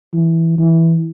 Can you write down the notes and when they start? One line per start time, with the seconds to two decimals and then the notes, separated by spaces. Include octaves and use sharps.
0.13 E3
0.58 E3